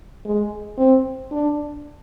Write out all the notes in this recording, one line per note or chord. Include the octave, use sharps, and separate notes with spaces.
G#3
C4
D4